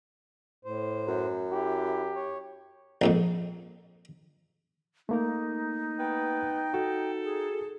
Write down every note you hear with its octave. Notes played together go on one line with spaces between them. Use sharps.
A2 C5
F#2
E4 G4
C#5
A#1 F2 G#2
A3 A#3 D#4 A#4
B3 G5
F#4 A4
G#4